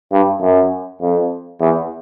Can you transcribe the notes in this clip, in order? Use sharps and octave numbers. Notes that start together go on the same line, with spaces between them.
G2
F#2
F2
E2